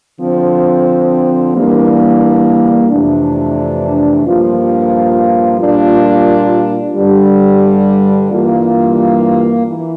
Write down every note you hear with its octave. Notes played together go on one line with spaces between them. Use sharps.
D3 F3 C4
E3 G3 A#3 D4
F2 C3 E3 A3 D4
G2 F3 A#3 F4
A#2 G3 A#3 D4 F4
G2 D3 G3
G2 E3 G3 A#3 F4
E3